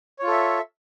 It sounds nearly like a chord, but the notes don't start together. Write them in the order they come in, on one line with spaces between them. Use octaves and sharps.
C#5 F4 A4 E5